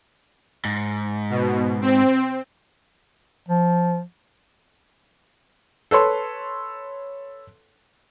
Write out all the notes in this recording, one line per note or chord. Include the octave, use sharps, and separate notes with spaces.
G#2
B2
C4
F3
A4 B4 C#5 C6